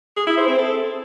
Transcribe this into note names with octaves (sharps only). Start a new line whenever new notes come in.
G#4
E4
C5
C4
A4